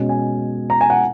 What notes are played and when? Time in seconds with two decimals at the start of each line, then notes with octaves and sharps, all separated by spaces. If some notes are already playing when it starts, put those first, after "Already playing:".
Already playing: B2 G#3 C#4
0.09 G#5
0.70 A#5
0.81 G#5
0.90 F#5